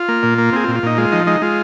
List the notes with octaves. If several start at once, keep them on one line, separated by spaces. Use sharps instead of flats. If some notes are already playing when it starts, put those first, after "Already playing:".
Already playing: F4
A#3
A#2
A#3
C4 G#4
F4
A#2
F4
A#2 D#4
G#3 F4
F3 D#4
G#3 D#4
G#3 F4